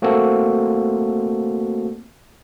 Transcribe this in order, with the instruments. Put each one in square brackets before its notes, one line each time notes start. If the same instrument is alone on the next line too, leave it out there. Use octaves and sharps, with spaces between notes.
[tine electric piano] A3 A#3 C4 F#4 A4